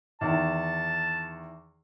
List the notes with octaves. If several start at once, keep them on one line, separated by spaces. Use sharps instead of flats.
E2 D#3 A5